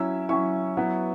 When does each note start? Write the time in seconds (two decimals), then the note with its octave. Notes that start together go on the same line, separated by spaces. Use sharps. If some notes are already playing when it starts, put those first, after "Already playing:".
Already playing: F#3 C#4 E4 E6
0.29 F#3 C#4 E4 C#6
0.77 F#3 B3 E4